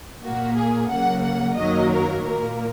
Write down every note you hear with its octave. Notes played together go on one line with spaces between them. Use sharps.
A#2 A#3 F#4
G#4
C#3 F#3 A#3 F#5
F#5
F#2 D#3 F#3 A#3 D#5
A#4
A#2 A#3 A#4